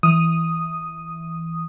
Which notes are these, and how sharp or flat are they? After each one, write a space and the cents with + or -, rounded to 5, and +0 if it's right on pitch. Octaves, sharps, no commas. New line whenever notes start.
E3 +0 D#6 +0